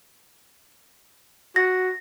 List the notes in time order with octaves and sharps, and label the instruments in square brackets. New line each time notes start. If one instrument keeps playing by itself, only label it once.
[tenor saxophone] F#4 [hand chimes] A#6